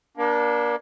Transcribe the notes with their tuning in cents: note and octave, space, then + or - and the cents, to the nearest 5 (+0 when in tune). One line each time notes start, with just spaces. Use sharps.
A#3 +35 D4 -5